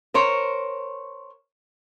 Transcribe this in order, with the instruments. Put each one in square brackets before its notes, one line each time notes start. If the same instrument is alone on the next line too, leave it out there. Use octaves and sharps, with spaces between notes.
[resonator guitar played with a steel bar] A#4 C5 C#5